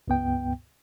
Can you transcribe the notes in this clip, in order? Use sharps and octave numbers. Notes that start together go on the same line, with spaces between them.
C#2 G2 B3 G5